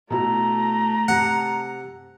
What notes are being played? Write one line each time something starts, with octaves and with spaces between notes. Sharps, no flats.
B2 A3 E4 A#5
C3 F#5